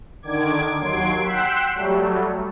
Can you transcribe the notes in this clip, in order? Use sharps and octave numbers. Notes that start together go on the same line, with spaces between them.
D3 D#3 D6 G#6
D#2 F#3 C6 G#6 D7
F#5 G5 C6 E6 F#6 B6
F#3 G3 A3